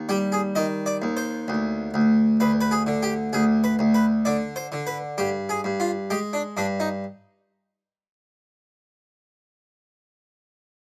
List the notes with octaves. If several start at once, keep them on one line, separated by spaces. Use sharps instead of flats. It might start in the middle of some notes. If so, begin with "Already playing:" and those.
Already playing: D#2
G3 G4
G#4
D#3 D#5
D5
D#2
C5
D2
D2
D2 B4
B4
G#4
D3
G4
D2 G#4
B4
D2
B4
D3 D5
C5
D3
B4
G2 G4
G#4
G2
F4
G#3 G4
D4
G2 D4
D#4